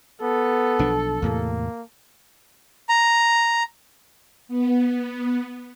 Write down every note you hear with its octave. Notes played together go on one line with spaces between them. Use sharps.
B3 A4
B1 F3 D4
E2 A2 C3 A#3
A#5
B3